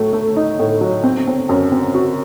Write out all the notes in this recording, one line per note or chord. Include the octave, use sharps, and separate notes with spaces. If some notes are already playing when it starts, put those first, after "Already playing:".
Already playing: A2 F#3 A3
A3
D#4
A2
F#3
C4
C4
F#2
C4
F#4